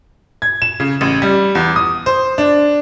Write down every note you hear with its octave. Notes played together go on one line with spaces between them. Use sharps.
G#6
E7
C#3
A1
G3
E2
D#6
C5
D4